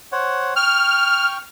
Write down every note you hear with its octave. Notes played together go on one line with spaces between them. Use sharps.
C5 C#5 F#5
G5 C#6 F6